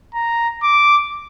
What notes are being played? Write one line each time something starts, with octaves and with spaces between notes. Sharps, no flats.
A#5
D6